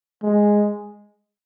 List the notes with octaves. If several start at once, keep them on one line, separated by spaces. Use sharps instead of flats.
G#3